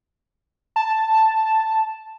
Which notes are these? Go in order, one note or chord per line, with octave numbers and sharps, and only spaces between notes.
A5